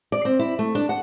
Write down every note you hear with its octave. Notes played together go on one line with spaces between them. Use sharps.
D5
C4
E4
A3
D4
F#5